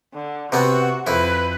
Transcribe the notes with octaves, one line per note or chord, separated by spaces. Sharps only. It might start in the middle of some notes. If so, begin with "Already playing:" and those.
D3
C3 B3 C4 F#4
F2 E4 B4